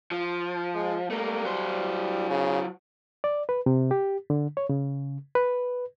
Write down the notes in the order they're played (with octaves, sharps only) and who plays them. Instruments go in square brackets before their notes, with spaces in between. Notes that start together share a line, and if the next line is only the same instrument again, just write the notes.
[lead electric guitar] F3
[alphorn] G#3
[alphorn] G3 [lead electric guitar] A3 A#3
[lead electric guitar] F#3 C5
[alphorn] C#3
[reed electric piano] D5
B4
C3
G4
D3
C#5
C#3
B4